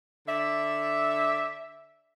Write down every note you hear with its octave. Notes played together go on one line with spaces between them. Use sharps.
D3 D5 E5